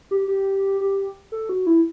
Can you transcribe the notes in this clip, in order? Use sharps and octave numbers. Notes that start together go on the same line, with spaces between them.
G4
G4
G4
A4
F#4
E4